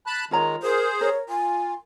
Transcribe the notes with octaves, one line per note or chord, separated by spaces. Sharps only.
A5 B5 F#6
D#3 G#3 F4 C#5 A#5
G#4 A#4 C5
A#4 C#5
F4 G#5